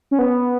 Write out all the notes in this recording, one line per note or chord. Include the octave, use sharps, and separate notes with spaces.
C#4
B3